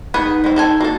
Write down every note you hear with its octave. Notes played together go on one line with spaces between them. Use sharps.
B3 D#4 G#4 B4
G#3 C4
C4 A4 G#5
A#3 F#4 A4